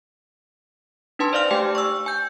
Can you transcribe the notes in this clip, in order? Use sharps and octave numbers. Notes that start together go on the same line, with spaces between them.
D4 D#4 B4 A5 C6
C5 D5 F5 F6
A3 G4 G5 G#5
C#6 E6
G#5 G6